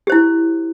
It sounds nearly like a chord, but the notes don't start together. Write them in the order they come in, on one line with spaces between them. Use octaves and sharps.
G4 C5 E4